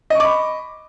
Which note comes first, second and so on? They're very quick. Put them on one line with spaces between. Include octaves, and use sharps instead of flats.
D#5 C#6 D6 B5